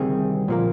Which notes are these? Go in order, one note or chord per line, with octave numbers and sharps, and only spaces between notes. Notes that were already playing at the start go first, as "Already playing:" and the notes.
Already playing: D2 C3 D#3 G3 C4 G#4
A#2 F3 A#3